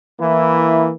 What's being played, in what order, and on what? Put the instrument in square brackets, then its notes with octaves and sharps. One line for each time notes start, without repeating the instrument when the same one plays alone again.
[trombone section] E3 A#3 E4